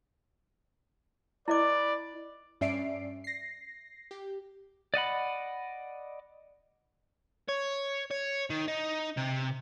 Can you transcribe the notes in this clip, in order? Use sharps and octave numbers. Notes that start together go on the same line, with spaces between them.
E4 B4 D5 D#5 D6
G2 C#4 D5 E5 C7 D7
A#6 C7
G4
D5 D#5 F#5 B5
C#5
C#5
D#3
D#4
C3